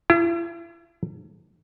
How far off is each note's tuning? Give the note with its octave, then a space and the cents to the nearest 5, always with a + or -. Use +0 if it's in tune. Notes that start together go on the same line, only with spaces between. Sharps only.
E4 +40